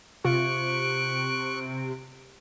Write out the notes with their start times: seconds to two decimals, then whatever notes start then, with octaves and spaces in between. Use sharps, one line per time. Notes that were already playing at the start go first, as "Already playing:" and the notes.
0.25 C3 F4 C#6 F#6 D7